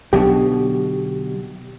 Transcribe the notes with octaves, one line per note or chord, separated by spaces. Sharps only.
B1 B2 D3 F#3 G4